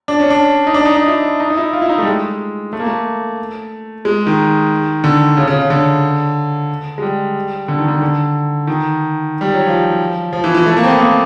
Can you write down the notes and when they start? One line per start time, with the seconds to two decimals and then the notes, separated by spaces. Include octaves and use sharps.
0.08 D4
0.20 C#4
0.30 D4
0.67 D#4
0.74 D4
0.85 D#4
0.96 D#4
1.07 E4
1.40 D#4
1.50 D#4
1.57 E4
1.73 F4
1.82 E4
1.89 D#4
1.98 A3
2.02 G3
2.07 G#3
2.73 A3
2.80 A#3
2.87 A3
4.05 G#3
4.27 D#3
5.04 D3
5.37 C#3
5.48 C#3
5.59 C#3
5.70 D3
6.98 G#3
7.02 G3
7.68 D3
7.78 D#3
7.88 D3
8.02 D3
8.67 D#3
9.41 G3
9.54 F#3
9.67 F3
10.33 F3
10.44 E3
10.55 E3
10.66 A3
10.77 A#3
10.84 C4
10.88 B3
10.99 A#3